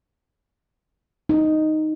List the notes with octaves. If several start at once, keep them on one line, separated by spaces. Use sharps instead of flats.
D#4